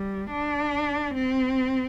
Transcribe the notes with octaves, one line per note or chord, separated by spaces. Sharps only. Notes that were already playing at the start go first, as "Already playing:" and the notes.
Already playing: G3
D4
C4